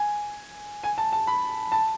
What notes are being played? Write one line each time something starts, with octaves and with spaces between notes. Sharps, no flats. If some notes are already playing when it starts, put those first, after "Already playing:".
Already playing: G#5
G#5
A5
A5
B5
A5